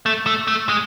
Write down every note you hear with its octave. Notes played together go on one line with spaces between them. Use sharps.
A3
A3
A3
G#3